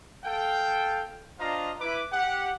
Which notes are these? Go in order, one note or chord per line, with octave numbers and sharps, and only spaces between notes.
A4 F5 G5
D4 F4 C5 D#5 F5 A#5
E4 B4 D6
G4 F#5